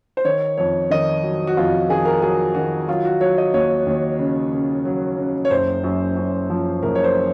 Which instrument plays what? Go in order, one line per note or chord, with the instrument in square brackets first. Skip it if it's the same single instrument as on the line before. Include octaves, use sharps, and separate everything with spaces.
[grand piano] C5
D#3 C#5
F2 C#5
D#3 D#5
F#3
F#4
F2 F4
D#3 G#4
A#4
F#3 G#4
D#3 F#4
F#3 F4
F#4
F#3 C#5
D#5
D#2 C#5
D#2
C#3
C#3
F#3
C#3
C#5
F#1 C5
F#2
F#2
F3
F#1 A#4
C#5
C5